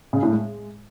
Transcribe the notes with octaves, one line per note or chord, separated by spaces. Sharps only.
C#3
A2
G#3